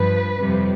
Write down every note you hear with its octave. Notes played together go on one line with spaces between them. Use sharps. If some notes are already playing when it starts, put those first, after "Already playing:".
Already playing: G2 F3 B4
F2 C3 G3